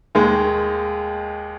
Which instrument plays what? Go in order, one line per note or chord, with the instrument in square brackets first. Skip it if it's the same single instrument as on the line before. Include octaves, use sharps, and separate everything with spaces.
[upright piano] D#2 D#3 G#3